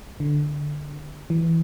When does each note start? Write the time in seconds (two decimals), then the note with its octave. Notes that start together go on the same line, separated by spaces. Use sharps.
0.20 D3
1.30 E3